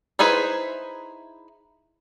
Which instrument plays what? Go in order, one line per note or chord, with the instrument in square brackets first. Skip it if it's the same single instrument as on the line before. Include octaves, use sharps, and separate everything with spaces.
[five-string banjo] D#4 E4 G#4 B4 C5